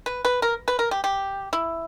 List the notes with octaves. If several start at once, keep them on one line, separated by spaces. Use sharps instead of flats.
B4
B4
A#4
B4
A#4
G4
G4
E4